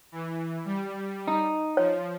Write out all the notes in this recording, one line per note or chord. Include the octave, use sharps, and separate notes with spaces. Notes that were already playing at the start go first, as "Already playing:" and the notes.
E3
G3
D#4
F3 C#5